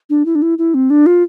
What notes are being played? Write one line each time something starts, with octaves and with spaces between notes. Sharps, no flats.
D4
E4
D4
E4
E4
C4
D4
F4